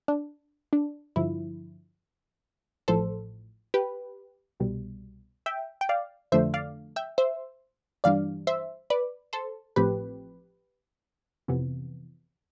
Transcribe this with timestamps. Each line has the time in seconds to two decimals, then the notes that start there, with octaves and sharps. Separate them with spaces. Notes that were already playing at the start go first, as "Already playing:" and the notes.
0.08 D4
0.73 D4
1.16 G2 D3 F3 E4
2.88 A1 A2 F3 A4 C5
3.74 G4 B4
4.60 C2 B2 G3
5.46 E5 G5
5.81 G5
5.89 D5 F5
6.32 F2 D3 F3 A3 D4 C5 E5
6.54 D5 F5
6.96 E5 G5
7.18 C5 E5
8.04 G2 E3 G3 D4 D5 F5
8.47 C5 E5
8.90 B4 D5
9.33 A4 C5
9.76 A1 A2 F3 C4 G4 B4
11.48 F2 C3 E3 B3